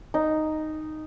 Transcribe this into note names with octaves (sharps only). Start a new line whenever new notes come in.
D#4